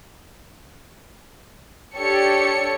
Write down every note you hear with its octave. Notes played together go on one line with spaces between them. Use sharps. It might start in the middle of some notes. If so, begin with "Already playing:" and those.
D4 G4 A4 C#5 C#7